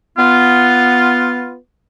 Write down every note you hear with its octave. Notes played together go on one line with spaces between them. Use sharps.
B3 F4